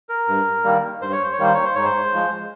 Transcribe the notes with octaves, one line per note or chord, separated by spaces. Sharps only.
A#4
G2
D#3 G3 A#3
G2 C5
C#5
C5
C#5
D#3 G3 A#3 C5
C#5
C5
G#2 C#5
C5
F3 G#3